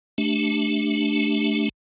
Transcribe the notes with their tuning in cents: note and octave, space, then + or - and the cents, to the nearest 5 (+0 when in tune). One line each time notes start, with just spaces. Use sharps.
A3 -15 D4 +0 G4 +0